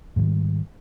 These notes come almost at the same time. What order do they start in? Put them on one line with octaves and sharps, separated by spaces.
G#2 E3 D#3 G3